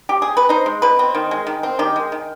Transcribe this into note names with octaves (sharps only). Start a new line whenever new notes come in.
G4
G#4
B4
D#4 C5
G#3
B2 B4
C4
D#3
G#3
D#3
C4
D#3 G4
G#3
D#3